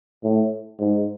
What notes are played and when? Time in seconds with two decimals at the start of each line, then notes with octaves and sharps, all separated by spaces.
0.24 A2
0.80 G#2